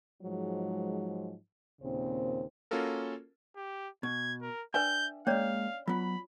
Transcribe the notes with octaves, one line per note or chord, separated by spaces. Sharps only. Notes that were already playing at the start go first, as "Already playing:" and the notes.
G#2 F3 F#3 G#3
D#2 A#2 C#3 C4 C5
A#3 C#4 F4 F#4 A4 A#4
G4
B2 G#6
A#4
D4 B4 D5 E5 G5 G6
G#3 A#3 C#4 C#5 D5 F5
F#3 B3 F4 B5